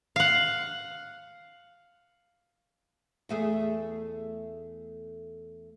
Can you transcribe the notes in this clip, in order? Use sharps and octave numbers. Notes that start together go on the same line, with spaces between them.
F5 F#5
E2 A3 G#4